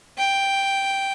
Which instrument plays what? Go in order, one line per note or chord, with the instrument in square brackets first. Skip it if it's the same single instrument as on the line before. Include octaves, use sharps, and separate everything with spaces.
[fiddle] G5